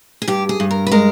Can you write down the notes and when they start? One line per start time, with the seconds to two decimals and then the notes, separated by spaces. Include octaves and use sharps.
0.22 G#4
0.28 G2 G4
0.49 G#4
0.60 G2
0.71 A#4
0.87 B4
0.92 G#3 A#4